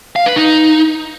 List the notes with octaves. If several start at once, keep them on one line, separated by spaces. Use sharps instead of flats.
F5
B4
D#4